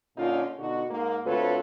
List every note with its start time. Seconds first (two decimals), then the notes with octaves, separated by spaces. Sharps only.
0.17 A#2 D3 C#4 D#4 F4
0.58 B2 D3 D#4 F#4
0.89 G#2 A#3
1.26 D2 C4 F4 A4 B4 C#5